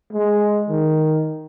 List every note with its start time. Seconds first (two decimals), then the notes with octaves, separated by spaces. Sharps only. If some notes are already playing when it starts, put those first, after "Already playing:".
0.12 G#3
0.69 D#3